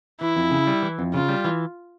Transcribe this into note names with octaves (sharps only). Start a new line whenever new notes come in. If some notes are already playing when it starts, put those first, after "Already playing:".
E3 E4
F2
C#3
G3
E3
F2
C#3 F4
G3
E3